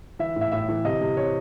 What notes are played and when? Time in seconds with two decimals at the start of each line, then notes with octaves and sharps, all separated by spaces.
0.19 E3 E5
0.36 A2
0.41 E5
0.52 A2 E5
0.69 E3
0.85 C3 D#5
1.01 C3
1.17 C3 C#5